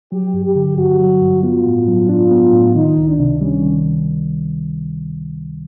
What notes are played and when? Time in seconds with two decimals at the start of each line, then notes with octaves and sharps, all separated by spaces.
0.12 F#3 G4
0.34 G2
0.45 G4
0.55 D3
0.77 G2 F#4
1.00 F#3
1.22 G2
1.43 B3 F4
1.66 A2
1.88 F#3
2.09 D4 F4
2.31 B3
2.53 A2
2.75 D#3 D#4
2.97 C#2
3.08 D4
3.19 C3
3.41 G3 C#4
3.62 D#3